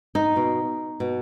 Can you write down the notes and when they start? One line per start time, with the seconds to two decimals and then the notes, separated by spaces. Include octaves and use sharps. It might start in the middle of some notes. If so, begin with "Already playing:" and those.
0.15 D#4
0.36 B2
1.00 B2